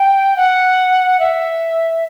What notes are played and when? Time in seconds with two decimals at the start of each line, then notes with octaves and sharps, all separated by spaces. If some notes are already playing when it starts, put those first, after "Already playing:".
Already playing: G5
0.36 F#5
1.19 E5